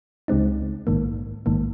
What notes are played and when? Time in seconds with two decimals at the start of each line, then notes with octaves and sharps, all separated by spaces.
0.28 C#2 C#3 G#3 C4 D#4
0.87 A#1 G#2 D#3 A#3
1.46 A#1 G#2 D#3 A#3